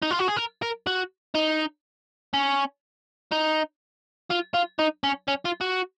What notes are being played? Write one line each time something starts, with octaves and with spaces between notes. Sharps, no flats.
D#4
F4
F#4
G#4
A#4
A#4
F#4
D#4
C#4
D#4
F4
F4
D#4
C#4
C#4
F4
F#4